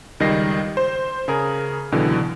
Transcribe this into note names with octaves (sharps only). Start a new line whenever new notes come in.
C#2 D#3 G3 D#5 A#6 C7
C5
C#3 G#4 A#4
C#2 B2 D3 E3 F#3